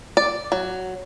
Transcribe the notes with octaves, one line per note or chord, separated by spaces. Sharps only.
D5
F#3